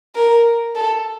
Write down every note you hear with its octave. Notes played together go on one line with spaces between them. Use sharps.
A#4
A4